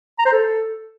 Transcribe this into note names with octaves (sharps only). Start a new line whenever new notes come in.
A#5
C5
A4